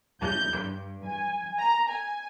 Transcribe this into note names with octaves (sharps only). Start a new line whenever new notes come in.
G6
G2
G#5
A#5
G#5